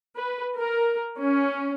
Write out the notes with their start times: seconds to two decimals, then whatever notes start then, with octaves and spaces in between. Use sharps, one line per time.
0.16 B4
0.57 A#4
1.19 C#4